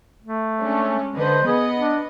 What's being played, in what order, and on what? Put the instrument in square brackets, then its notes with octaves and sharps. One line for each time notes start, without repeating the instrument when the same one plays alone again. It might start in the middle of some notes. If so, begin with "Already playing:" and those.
[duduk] A3
[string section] G#3 C#4 D4
[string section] D3 B4 D#5 [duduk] C5
[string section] B3 D#5 [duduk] G#4
[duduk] D4